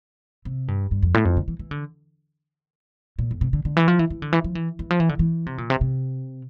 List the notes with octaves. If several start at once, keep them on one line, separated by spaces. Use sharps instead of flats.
C3
G2
G2
F2
A2
F2
D3
E3
E3
D3
A#2
F2
C3
D3
D3
E3
F3
E3
E3
D3
E3
F3
E3
E3
F3
E3
D3
E3
C3
A#2
C3
C3